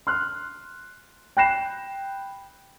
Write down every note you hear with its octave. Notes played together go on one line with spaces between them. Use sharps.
C6 F6 F#6
G5 B5 F#6 A#6 C7 E7